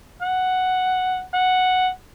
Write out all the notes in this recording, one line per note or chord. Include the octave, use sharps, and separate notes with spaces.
F#5
F#5